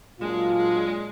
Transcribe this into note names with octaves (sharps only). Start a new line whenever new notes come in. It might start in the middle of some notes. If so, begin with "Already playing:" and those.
A#2 F#3 G#3 D4 F4
G#3